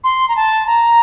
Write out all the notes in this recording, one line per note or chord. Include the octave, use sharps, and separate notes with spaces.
C6
A#5
A5
A#5